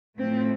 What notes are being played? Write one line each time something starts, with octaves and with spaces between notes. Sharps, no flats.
A2 F3 A3 C4